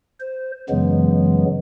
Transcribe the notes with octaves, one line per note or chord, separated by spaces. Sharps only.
C5
F#2 C#3 E3 F#3 G#3 B3